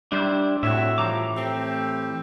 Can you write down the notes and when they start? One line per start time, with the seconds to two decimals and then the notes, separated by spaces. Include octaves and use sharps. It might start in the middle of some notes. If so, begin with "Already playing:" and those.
0.12 G3 D4 E4 C5
0.63 A2 C4 F#4 C#5 E5
0.98 G2 E3 F3 A#5 D6
1.35 A3 C4 G4